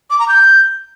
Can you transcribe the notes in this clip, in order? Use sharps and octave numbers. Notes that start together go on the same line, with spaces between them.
D6
A#5
G6